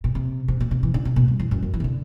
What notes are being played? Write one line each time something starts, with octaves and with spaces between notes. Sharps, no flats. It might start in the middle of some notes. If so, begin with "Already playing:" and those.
B2
C3
C3
B2
C3
E3
D3
C3
B2
G2
E2
F#2
F#2
E3
C3
D3